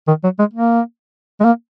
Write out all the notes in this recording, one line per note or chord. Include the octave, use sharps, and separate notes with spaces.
D#3
F#3
G#3
A#3
G#3
A#3